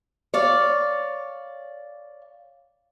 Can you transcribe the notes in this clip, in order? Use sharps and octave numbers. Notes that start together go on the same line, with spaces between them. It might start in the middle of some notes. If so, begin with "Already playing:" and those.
C#5 D5 F5